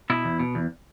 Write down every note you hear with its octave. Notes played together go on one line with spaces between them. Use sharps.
B2 E4
E2
B2
E2